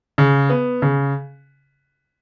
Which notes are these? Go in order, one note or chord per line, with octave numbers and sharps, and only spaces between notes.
C#3
B3
C#3